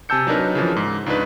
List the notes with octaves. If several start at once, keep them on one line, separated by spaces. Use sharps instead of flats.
C3 G#5 A5 E6 G6 C#7
F#3 D4 D#4 A#4 B4
C#3 E3 F3
G#2
C#2 D4 D#4 B4